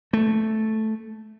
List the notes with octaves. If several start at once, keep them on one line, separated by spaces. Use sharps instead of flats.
A3